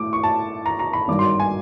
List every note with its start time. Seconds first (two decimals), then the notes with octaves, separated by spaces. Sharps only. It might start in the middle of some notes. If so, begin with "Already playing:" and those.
Already playing: A2 A3 D6
0.13 C#6
0.23 A5
0.66 A#5
0.79 A#5
0.93 B5
1.08 G#1 G2 D#3 F#3 D6
1.19 C6
1.40 G#5